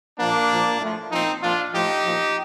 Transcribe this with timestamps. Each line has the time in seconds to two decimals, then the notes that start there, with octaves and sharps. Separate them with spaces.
0.19 A#2 F3 A#3 D4
0.51 A#2 F3
0.81 A2 F3
1.12 A#2 F3 C4 D#4
1.43 A#2 F3 D4 F4
1.74 A2 F3 D#4 G4
2.05 A#2 F3